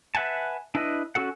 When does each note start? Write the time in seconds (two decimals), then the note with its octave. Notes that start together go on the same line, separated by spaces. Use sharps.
0.15 B4 E5 F#5 G#5 A5
0.75 D4 E4 B4 D#5
1.15 C#4 F#4 A4 F#5